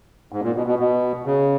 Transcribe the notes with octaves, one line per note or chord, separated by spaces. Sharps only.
G#2
A#2
B2
B2
B2
C#3